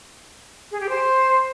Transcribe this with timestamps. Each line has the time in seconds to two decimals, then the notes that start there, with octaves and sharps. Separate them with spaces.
0.71 G#4
0.80 G4
0.89 C5